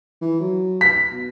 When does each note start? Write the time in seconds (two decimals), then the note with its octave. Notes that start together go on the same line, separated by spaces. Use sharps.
0.22 E3
0.40 F#3
0.81 B6
1.12 B2